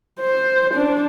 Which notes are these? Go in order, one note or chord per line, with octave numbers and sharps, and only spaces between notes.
C5
D4